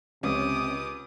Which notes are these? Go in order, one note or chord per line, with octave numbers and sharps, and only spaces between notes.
C#2 C3 C#4 D6 D#6